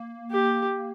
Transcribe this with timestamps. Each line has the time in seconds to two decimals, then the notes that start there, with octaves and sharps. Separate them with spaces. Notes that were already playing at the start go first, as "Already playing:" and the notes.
Already playing: A#3
0.31 G4